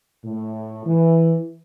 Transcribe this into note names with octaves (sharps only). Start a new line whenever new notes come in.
A2
E3